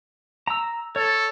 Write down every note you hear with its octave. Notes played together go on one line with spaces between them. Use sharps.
A#5 E6
A4 C#5